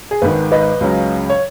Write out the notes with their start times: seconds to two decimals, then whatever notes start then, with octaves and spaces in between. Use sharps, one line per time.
0.11 G#4
0.22 G#1 G#2 D#3 B4
0.52 B4 D#5
0.81 C#2 C#3 F#3
1.30 C#5